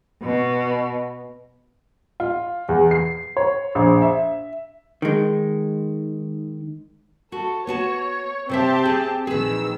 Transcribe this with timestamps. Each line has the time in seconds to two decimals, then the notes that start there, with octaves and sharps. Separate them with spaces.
0.23 B2
2.20 F4
2.69 E2
2.91 C7
3.37 C#5
3.75 A#1
4.02 E5
5.02 D#3 G#3
7.32 F#4 A4
7.67 B3 F#4 C#5 A5
8.49 C3 C4 G4 C5 E5 A5
8.85 G#4
9.27 A#1 D#3 G#4 B4 E6